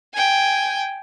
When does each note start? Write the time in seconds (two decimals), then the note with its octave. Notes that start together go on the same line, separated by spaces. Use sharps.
0.13 G5 G#5